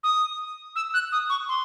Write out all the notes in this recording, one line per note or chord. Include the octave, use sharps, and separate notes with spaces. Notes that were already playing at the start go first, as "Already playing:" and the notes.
D#6
E6
F#6
D#6
C#6
C6